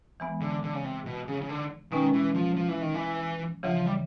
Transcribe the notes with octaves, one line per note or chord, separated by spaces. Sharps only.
E3 G#3 B3
D3
D3
C#3
C3
B2
C#3
C#3
D3
B2 D#3 G#3 C#4
E3
F3
F3
E3
D#3
E3
D2 C#3 E3 F3
G3